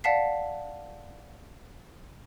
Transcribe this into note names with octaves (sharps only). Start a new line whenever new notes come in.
D5 F5 F#5 A5 B6 C7